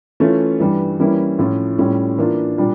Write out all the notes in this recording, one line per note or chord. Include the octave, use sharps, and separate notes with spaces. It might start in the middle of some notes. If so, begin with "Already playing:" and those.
E3 A3 C#4 F4
G2 E3 G3
E3 G3 A#3 C#4 E4
A2 F3 C#4 F4
A2 G3 C#4 F4
E3 A#3 D4 F4
A#2 G3 D4